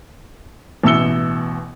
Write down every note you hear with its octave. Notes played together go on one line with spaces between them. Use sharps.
A1 B2 E4 E6 C#7 G7